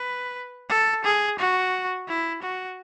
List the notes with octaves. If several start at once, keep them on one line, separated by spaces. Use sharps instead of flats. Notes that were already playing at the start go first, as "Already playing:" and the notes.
Already playing: B4
A4
G#4
F#4
E4
F#4